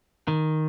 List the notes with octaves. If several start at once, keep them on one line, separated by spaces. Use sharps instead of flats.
D#3